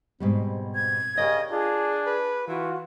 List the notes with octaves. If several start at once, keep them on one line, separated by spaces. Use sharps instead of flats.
G#2 B2 G3 C4
G#6
C#3 G4 A#4 D5 D#5
D4 F4 G#4
B4
E3 F4 F#4